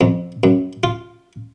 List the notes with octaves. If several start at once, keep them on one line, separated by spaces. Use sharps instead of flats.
F2
F#2
F4